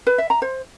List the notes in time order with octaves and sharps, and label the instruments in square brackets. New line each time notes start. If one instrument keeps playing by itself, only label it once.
[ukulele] B4
E5
A#5
C5